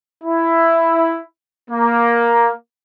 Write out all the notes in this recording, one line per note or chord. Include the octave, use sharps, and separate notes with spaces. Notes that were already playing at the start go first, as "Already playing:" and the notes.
E4
A#3